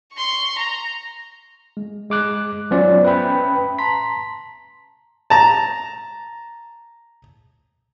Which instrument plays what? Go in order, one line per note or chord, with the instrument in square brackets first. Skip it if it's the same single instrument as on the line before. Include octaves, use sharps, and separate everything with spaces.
[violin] C6 C#6
A#5
[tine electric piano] G#3
G#3 D6 F#6
F#3 B3 C#4 F4 C5 D5
C#4 B4 E5 G5 B5
A5 A#5 C6 B6
[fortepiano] A5 A#5